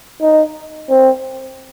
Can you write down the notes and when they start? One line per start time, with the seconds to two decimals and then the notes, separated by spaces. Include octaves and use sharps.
0.22 D#4
0.89 C4